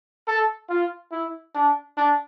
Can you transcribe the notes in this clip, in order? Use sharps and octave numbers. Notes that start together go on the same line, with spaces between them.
A4
F4
E4
D4
D4